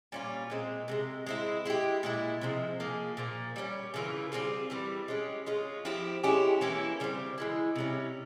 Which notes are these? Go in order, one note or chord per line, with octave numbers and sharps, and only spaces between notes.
A#2 G3 C#4 F4
A#2 G#3 C4
C3 F3 G#3
G#3 C4 E4
G#3 E4 G4
A#2 G#3 E4
C3 F3 G#3
F3 A#3 F4 G#4
A#2 F3 A#3
G3 A#3 C#4
C#3 E3 A#3 F4
G3 C4 F4 G#4
E3 G3 C4
G#3 C#4 G4
G#3 C#4 F4
F3 C4 E4 G4
G#3 C#4 E4 G4
E3 A#3 C#4 E4
C#3 G3 C4
E3 G#3 E4
C3 G3 C#4